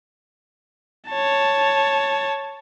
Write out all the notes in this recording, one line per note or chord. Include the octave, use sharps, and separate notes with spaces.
C#5 A5